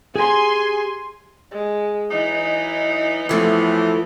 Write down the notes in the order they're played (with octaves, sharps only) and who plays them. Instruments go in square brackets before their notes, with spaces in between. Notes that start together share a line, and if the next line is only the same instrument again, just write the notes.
[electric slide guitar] G4 G#4 [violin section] G#5 C6
[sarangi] G#3
[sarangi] E3 [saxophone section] F#3 D#4
[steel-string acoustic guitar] E2 F3 A3 [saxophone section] A2 E3 [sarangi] B3